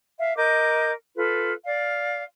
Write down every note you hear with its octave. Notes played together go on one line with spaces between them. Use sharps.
E5 F5
A#4 D#5 D6 G6
F4 A4 B4
D5 F5